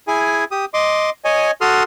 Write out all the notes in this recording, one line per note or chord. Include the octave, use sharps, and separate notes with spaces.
E4 G#4 G#5
G4 D#6
D#5 C6 D6
C#5 D#5 G#5
F#4 A4 C6 D#6 F6